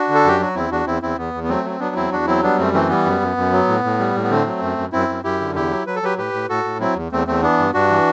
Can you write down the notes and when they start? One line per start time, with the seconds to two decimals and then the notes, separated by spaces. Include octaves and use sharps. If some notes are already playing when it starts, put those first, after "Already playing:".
Already playing: D4 F#4
0.08 D3
0.15 A4
0.25 F#2 G4
0.40 F#3 F#4
0.55 E2 C4 E4
0.70 E2 D4 F#4
0.87 E2 C4 E4
1.02 E2 C4 E4
1.18 E2 B3
1.34 E2
1.44 B3
1.49 F#3 A3 C4
1.65 F#3 C4
1.80 F#3 B3 D4
1.96 E2 C4 E4
2.11 E2 D4 F#4
2.27 F#3 C4 E4
2.43 G3 B3 D4
2.58 F#2 A3 C4
2.74 E3 A3 C4
2.89 G3 B3
3.06 F#2
3.22 F#2
3.37 F#2
3.52 F#3
3.68 A2
3.84 A2
3.99 G3
4.15 A2
4.24 B3
4.30 D3 A3 C4
4.46 F#3
4.62 F#2
4.78 F#2
4.93 F#2 C4 E4
5.09 F#2
5.24 F#2 E4 G4
5.40 D3
5.55 E2 E4 G4
5.71 F#3
5.87 F#3 B4
5.96 A4
6.03 F#3 G4 B4
6.18 A2 G4 B4
6.33 A2
6.49 A2 F#4 A4
6.64 A2
6.80 F#3 C4 E4
6.96 E2
7.12 E2 A3 C4
7.27 E2 A3 C4
7.42 E3 B3 D4
7.59 G2
7.74 G2 D4 F#4
7.90 E3